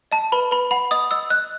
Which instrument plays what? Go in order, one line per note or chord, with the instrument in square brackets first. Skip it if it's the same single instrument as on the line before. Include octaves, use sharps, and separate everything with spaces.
[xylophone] D#5 A5
B4 B5
B4 B5
F#5 B5
D#5 D#6
D#5 E6
D#5 F#6